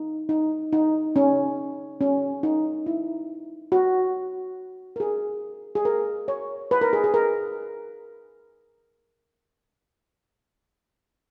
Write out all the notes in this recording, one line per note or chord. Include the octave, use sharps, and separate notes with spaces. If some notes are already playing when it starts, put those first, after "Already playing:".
Already playing: D#4
D#4
D#4
C#4
C#4
D#4
E4
F#4
A#4
G#4
G#4
A#4
C#5
B4
A#4
G#4
G#4
A#4